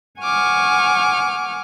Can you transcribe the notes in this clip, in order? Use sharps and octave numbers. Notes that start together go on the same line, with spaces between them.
F#5 G#5 C#6 D6 F6